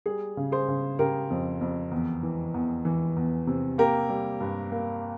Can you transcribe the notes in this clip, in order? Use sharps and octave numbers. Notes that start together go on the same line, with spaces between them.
G3 G#4
C#3
G#4 C5
C#3
C#3 G4 A#4
F2
F2
E2
E3
E2
E3
E2
C3
A#3 G4 A#4
G3
G2
A#3